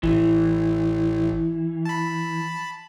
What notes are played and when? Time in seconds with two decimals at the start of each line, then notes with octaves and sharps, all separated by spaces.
0.03 A1 E3
1.85 A5 B5